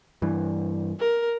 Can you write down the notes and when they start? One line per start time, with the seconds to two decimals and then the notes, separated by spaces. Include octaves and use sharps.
0.22 G2 E3
0.99 A#4